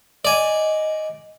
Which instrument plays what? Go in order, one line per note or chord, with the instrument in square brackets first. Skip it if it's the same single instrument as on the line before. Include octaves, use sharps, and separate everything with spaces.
[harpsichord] D5 G#5 [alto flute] D#5